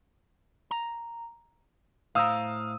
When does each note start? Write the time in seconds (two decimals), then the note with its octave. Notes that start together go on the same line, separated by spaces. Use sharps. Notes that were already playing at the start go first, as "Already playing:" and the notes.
0.71 A#5
2.15 A2 C5 F5 A#5 D#6 E6